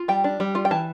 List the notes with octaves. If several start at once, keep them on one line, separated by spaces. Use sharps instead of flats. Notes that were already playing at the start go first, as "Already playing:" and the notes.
Already playing: F4
G3 G5
D4
G3
F4
G5
E3 A5